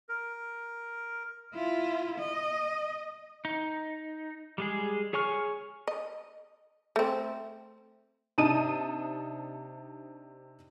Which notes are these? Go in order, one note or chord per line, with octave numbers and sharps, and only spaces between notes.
A#4
E4 F4
D#5
D#4
G3 G#3 G#4
G#4 C#5 G#5 C#6 F6
D#5
A3 C4
C3 D4 D#4 A5 D#6 D#7